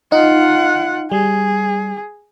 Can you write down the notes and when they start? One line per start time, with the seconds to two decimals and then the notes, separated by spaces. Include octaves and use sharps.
0.12 D#4 F4 F#5
1.12 G3 G#4